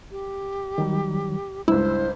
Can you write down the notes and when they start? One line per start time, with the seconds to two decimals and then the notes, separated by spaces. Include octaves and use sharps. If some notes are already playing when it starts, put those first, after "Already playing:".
0.11 G4
0.78 D#3 F#3 G3
1.68 C#2 G2 E4 C5 E6